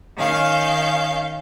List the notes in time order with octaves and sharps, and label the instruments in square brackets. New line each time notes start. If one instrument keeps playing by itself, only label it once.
[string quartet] D#3 C#4 F5 G6